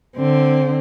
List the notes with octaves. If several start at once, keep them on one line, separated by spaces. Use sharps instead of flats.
D3 C4